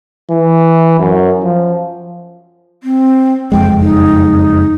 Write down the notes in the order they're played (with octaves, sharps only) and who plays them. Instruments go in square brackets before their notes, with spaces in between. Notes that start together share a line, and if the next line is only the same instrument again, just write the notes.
[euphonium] E3
F#2
F3
[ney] C4
[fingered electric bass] F#1 F2 G#3 [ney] G5
[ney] D#4